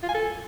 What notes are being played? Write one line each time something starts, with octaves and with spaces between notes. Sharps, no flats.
F4
G#5
A4